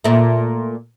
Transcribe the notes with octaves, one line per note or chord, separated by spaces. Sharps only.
A#2 A3